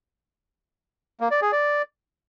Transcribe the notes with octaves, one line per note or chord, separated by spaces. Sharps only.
A#3
D5
G#4
D5